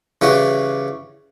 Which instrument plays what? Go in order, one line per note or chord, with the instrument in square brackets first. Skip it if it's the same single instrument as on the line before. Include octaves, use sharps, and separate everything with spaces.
[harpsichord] C#3 E3 G3 F#4